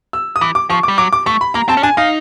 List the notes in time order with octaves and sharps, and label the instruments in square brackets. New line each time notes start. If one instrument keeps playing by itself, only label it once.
[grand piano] E6
D#6
[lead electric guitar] E3 [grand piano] D6
[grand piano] D6
[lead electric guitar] F3 [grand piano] C#6
[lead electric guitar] G3 [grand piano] D6
[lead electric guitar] F#3 [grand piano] D6
[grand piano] D6
[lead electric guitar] A3 [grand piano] C#6
[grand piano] B5
[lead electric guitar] A#3 [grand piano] A#5
[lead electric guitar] C4 [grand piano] A5
[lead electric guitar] C#4
[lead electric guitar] D4 [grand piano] G#5
[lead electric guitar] D#4 [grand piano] F5